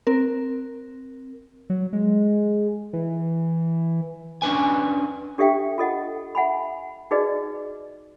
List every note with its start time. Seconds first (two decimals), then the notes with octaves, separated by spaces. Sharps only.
0.07 C4 A#4
1.70 F#3
1.93 G#3
2.93 E3
4.42 C#4 D4 B4 G#5
5.38 D4 G4 A4 E5 F5 G5
5.78 F4 A4 D#5 F#5
6.35 E5 F#5 G#5 B5
7.11 D#4 F#4 G#4 B4 D5 D#5